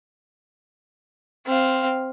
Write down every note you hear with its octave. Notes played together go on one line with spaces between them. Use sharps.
C4 F5